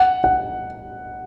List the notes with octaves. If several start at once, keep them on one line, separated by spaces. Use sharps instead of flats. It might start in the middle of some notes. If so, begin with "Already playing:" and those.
Already playing: F#5
F#5